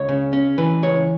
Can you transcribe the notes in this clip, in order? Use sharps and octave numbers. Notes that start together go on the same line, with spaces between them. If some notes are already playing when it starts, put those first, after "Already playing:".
Already playing: C#2 C#5
C#3
C#4
E3 B4
C#2 C#5